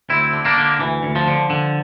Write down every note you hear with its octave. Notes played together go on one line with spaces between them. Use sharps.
D2 C4 E4
D3
A#3 D4
D3
D2 E3
D2
F3
D3
D3